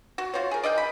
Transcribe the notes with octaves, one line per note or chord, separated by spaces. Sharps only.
F#4
F4 F#4 C5 C#5
G#4 A#4
D5 D#5 F5 G5
B5